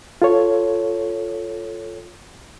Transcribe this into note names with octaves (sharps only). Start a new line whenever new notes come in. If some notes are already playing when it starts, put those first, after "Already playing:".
F4 A4 C#5